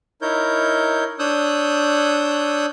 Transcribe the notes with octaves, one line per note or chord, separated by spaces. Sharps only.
D#4 E4 A#4 C#5 G6
D4 C#5 D#6 E6 F#6 G6